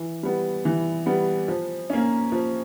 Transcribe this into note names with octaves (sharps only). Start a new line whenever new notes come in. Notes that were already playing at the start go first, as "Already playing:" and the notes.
Already playing: E3
G3 B3
E3
G3 B3
F3
A#3 C#4
F3